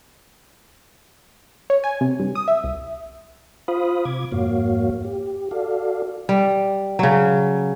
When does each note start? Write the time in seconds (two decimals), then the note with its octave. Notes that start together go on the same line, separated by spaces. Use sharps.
1.70 C#5
1.84 G#5
2.01 C3
2.20 G2
2.35 D#6
2.48 E5
2.64 C2
3.68 F4 C5 F5 B5 D#6
4.05 C3 D6 G#6
4.32 F2 G#2 A#3 F#4 C#5 F5
5.05 G4
5.51 F#4 A4 D5 F5
6.29 G3
6.99 C#3 F#3